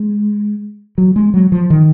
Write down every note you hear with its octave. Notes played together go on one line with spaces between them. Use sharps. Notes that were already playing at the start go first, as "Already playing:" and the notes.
Already playing: G#3
F#3
G#3
F#3
F3
D#3